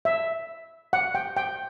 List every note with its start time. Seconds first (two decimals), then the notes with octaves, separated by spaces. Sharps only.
0.05 E5
0.93 F#5
1.15 G5
1.37 G5